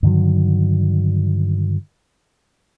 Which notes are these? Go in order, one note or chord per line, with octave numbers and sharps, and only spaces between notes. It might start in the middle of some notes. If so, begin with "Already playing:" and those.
G2 D3 D#3 F#3